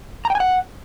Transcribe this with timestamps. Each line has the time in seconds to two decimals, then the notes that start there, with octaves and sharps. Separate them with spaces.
0.25 A#5
0.30 G5
0.35 G#5
0.40 F#5